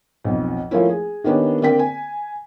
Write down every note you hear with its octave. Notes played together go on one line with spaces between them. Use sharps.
B1 F2
F3 A3 A#3 C#4 E4
G#4
D#3 A#3 B3 C#4 D4 G4
D3 A#3 C4 D5 G5 B6
G#5